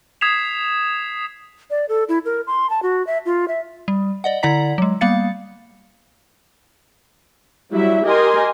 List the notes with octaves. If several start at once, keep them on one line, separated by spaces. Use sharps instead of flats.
D#6 G#6 B6 C7 E7 F7
D5
A4
E4
A#4
C6
A5
F#4
E5
F4
E5
G3
D5 D#5 F#5
D3 E4 D5 F#5 A#5 B6
F#3 G#3
G3 A#3 B3 F5 A6 C#7
F#3 G3 E4 E5
G4 A#4 D#5 G#5 C6